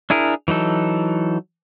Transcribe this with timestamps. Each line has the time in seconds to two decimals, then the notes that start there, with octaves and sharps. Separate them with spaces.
0.10 D4 E4 G#4 A#4
0.48 E3 F#3 D#4 A4